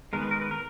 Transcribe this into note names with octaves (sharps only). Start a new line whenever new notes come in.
D#3 G#3 B3 A#4
B4
A#4
B4
A#4